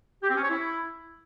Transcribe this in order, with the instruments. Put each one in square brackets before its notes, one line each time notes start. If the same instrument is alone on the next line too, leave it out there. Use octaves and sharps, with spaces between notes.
[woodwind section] G4
C4
C#4
C#5
E4